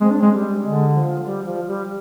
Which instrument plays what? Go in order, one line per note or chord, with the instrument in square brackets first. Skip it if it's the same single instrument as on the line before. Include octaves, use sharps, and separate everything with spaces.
[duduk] G#3 [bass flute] C4
[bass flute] D4
[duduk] G#3 [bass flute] C4
[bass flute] G3
[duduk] D3 [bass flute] G#3
[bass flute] F3
G3
F3
G3